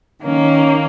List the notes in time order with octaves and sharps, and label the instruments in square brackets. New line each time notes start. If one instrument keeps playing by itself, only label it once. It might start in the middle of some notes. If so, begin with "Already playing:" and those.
[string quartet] D#3 A#3 C#4